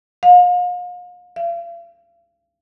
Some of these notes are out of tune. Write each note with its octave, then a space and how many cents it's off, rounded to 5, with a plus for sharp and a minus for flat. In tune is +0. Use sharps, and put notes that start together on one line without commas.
F5 +40
F5 -40